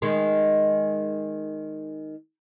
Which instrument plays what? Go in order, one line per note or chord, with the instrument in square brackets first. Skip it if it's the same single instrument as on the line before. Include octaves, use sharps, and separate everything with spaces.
[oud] D#3 G#3